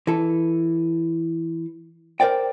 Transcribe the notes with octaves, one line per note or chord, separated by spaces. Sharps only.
E3 A4
A#4 C5 D5 G5